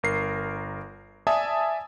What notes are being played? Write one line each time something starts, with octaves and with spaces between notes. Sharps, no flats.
G1 A#4 C7
D5 E5 G#5 A5 D#6